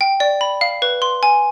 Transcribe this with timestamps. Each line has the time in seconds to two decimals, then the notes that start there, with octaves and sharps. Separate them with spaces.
0.01 G5
0.20 D5
0.41 B5
0.61 F5
0.82 B4
1.02 C6
1.23 G#5